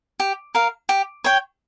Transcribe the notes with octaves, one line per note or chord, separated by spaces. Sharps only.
G4
A#4 F5
G4
C#5 G5